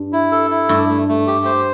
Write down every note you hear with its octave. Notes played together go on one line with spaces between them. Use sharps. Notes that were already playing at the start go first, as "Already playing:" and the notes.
Already playing: G2
E4
A4
E4
G2 A3
A3
A3
G4
C5